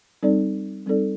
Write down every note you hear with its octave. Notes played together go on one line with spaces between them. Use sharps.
G3 C4 D#4 A4 D5
G3 C4 D#4 A4 D5